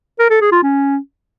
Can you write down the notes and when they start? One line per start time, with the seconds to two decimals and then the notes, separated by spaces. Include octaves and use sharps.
0.19 A#4
0.30 A4
0.41 G#4
0.52 F4
0.63 C#4